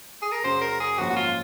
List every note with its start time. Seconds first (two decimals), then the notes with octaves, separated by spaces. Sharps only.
0.22 G#4
0.32 A#4
0.44 F#2 C#3 F#3 C5
0.61 A#4
0.80 G#4
0.98 G#1 F#2 F3 A#3 C#4 F#4
1.10 F#4
1.16 F4